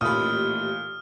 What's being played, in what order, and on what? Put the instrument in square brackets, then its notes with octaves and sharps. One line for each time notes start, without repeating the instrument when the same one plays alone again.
[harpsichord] A1 D#2 A4 [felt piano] A#2 [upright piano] B5 D#6 [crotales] F6